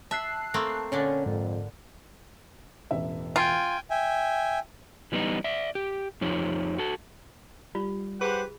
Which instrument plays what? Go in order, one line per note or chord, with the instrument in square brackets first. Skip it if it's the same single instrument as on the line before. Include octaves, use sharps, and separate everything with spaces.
[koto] E5 [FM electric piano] A5 F#6 C7
[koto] A3 A#3 C4
[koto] A#2 D3 D4 [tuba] C#4
[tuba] F2 [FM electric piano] G#2
[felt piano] E1 A1 E5
[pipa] F4 [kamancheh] G5 G#5
[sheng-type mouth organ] E5 G5 G#5
[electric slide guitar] E3 G3 B3 D#4
D5 E5
G4
F2 F3 D#4 G4 C#5
F#4 A4
[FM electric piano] G3 [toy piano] F4
[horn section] G4 C5 F#5 [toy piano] G#4 B5 [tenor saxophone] B4